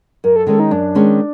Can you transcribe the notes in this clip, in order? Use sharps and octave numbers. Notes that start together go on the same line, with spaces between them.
F#2 A#4
A4
D#3 G#3 C#4 A4
D#4
F#2 D4
D#3 G#3 C#4